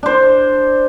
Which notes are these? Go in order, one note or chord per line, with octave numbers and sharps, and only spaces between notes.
D4 C5